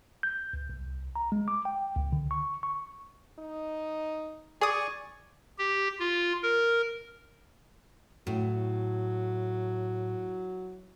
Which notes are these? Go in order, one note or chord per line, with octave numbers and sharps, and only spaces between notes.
G6
C#2
C2
A#5
G#3
D6
G5
C#2
D3
C#6
C#6
D#4
G#4 D5 G#5 C#6 D#6
G4
F4
A#4
A2 F#3